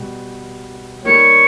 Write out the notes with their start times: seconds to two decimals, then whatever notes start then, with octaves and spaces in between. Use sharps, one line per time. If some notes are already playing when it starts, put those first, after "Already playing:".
Already playing: B2 G3
1.05 G3 A#3 D#4 G4 C#5